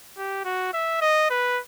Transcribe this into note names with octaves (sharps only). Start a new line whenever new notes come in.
G4
F#4
E5
D#5
B4